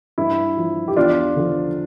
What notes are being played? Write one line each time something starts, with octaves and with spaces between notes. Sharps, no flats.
G2 E4
F3
G4
E2 D4 F4
D3 F3